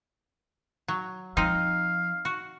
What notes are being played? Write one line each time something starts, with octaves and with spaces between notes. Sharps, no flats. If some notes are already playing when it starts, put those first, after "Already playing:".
F#3
F3 C4 D#4 F5
F#4